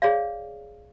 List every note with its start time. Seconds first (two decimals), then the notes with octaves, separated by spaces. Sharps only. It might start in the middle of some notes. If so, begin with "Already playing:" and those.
0.02 G#4 C#5 D5 F5